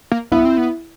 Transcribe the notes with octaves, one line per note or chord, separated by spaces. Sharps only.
A#3
B3 E4 E5
C4
B3